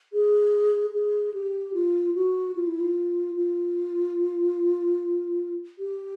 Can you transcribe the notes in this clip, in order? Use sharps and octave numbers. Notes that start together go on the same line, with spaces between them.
G#4
G#4
G4
F4
F#4
F4
E4
F4
F4
G4